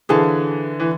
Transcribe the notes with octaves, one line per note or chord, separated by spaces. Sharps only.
D3 E3 G#4 C5 F5 A5
E3